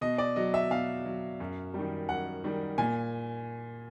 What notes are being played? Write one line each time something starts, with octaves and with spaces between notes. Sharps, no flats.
B2 D#5
D5
F#3 D#5
E5
B2 F5
F#3
F#2
D#3 G3
F#2 F#5
D#3 G3
A#2 G#5